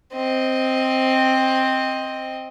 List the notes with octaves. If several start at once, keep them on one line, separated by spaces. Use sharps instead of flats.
C4 D#5